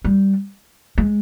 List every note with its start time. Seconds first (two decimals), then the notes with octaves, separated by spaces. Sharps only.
0.04 G3
0.98 G#3